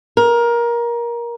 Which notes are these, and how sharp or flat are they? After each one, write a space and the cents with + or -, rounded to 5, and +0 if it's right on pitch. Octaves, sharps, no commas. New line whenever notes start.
A#4 +20